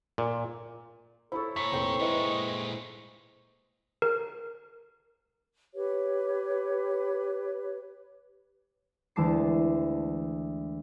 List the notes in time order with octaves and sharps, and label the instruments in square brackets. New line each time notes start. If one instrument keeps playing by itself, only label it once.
[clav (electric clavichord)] A#2
[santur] E4 C#5 [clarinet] A4 [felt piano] C5 B5 C#6
[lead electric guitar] A#2 [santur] A4 D6 [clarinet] C#6 [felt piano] B6
[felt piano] F1 A4 [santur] C5 G5
[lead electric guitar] A#2 G#3 [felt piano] E4 B4 D#5
[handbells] A#4
[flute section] G4 B4 C#5
[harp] D2 E3 G#3 A5 D6 C7